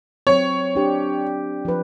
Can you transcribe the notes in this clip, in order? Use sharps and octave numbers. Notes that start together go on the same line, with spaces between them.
F#3 C4 C#5
D4 G4
F3 B4